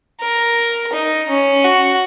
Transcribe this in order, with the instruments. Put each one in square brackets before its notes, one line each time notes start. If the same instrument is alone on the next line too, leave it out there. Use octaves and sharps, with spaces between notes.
[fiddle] A#4
D#4
C#4
F#4